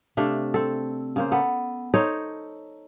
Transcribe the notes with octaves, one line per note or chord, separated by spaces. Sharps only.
C3 A3 D4 F5
C4 A4
C#3 A#3 C5
B3 A4
D#4 A4 C5 C#5